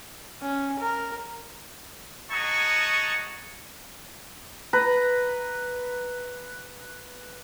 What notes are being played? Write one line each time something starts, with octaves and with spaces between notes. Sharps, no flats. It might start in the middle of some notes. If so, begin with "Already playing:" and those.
C#4
A#4
D#4 F#4 G#4 A5 C#6
B4 A#5